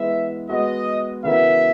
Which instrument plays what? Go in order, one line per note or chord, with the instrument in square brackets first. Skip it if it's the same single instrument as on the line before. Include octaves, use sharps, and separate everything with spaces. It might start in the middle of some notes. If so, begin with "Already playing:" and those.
Already playing: [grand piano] E3 G#3 B3 [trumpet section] E5
[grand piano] G#3 B3 F#4 [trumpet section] D#5
[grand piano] C#3 E3 B3 F#4 A#4 [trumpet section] E5